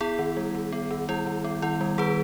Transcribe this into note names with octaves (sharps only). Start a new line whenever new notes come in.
B3 E4 G#4
D#3
G3
D#3
B3
D#3
G3 E4
D#3
B3
D#3 E4
G3
D#3 G#4 B4